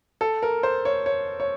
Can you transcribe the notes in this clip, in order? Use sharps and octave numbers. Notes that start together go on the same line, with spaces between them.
A4
A#4
C5
C#5
C#5
C#5